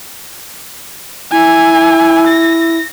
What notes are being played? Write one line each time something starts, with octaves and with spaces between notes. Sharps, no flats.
E4 G#5
A#6